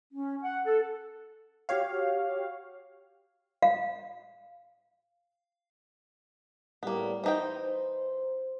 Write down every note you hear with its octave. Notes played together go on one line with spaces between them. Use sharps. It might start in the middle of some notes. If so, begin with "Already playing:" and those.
C#4
F#5
A4
F#4 G4 C#5 F5
F5
A2 G3 A#3 B3
E3 D#4 C5 G5